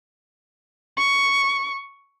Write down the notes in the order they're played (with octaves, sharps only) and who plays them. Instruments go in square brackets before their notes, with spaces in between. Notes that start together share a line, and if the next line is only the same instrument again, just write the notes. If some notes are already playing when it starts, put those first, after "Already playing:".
[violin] C#6